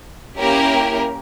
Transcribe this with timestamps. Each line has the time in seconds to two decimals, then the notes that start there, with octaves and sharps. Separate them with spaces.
0.38 A#3 C#4 E4 G4 A#4